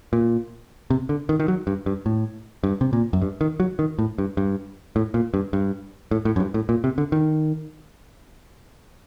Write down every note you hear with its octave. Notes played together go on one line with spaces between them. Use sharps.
A#2
C3
D3
D#3
D#3
F#3
G2
G2
A2
G2
C3
A#2
F#2
G2
D#3
F#3
D#3
A2
G2
G2
A2
A#2
G2
G2
A2
A2
F#2
G2
A2
A#2
C3
D3
D#3